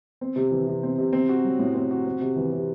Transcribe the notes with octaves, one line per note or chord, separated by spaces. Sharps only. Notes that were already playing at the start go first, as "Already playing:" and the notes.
C4
C3
E3
C3
C4
C3
C4
F#4
F#3
A2
C4
F#4
C4
C3
E3
C3